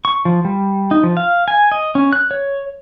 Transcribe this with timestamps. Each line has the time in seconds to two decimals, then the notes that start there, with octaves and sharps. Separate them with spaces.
0.05 C#6
0.25 F3
0.45 G3
0.91 D#4
1.03 F3
1.17 F5
1.48 G#5
1.72 D#5
1.95 C#4
2.13 F#6
2.31 C#5